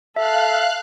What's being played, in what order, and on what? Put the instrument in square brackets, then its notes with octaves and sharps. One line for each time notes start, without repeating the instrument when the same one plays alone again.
[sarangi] A4 [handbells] E5 [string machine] F5 F#6